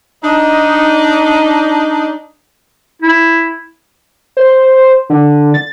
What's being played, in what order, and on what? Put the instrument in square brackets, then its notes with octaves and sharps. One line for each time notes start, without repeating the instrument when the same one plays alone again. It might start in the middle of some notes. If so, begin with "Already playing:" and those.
[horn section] D4 D#4
[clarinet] E4
[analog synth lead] C5
D3
A6